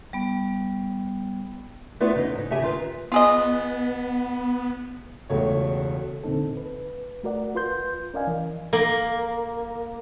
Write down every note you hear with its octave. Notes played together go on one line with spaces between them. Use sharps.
G3 B3
A3 B3 E4 F4 B4 D5
E2 C#3 C#4 D#4 D#5
G#2 D#4
C#3 G4 E5 G#5
D#3 F4 B4
B3 F4 G#4 D#5
E1 C#2 A3 C#5
E2 A#2 D3 C4 D#4 A4
B4
A3 F#4 A#4 D5 F#5
F4 B4 C6 G6
C#4 A#4 D5 D#5 F5 G#5
E3
A#3